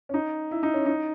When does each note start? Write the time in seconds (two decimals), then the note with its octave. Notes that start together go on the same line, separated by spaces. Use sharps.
0.09 C#4
0.14 D#4
0.51 E4
0.63 D#4
0.74 C#4
0.86 D#4